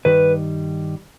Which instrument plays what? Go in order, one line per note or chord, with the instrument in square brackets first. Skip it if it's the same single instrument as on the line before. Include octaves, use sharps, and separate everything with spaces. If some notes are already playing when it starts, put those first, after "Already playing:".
[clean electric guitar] G2 D#3 G3 [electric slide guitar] B4